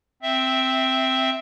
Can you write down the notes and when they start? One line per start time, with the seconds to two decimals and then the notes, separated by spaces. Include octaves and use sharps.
0.22 C4 E5